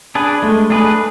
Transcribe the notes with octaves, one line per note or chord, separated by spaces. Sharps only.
D4 G#4 B4
G#3 A3
A3 D4 G#4 B4